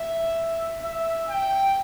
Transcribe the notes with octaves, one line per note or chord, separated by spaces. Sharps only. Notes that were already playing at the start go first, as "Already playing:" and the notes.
Already playing: E5
E5
G5